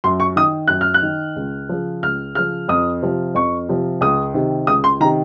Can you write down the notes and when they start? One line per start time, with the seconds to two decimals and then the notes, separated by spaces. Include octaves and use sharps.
0.04 F#2 C6
0.20 C#6
0.36 D#3 D#6
0.67 F#2 F#6
0.81 F6
0.94 F#6
1.02 D#3
1.36 C#2
1.69 C#3 F3
2.03 C#2 F6
2.35 C#3 F3 F6
2.68 F2 D#6
3.03 C3 F3
3.35 F2 C#6
3.69 C3 F3
4.01 C#2 D#6
4.34 C3 D#3
4.67 C#2 D#6
4.84 C6
5.00 C3 D#3 A#5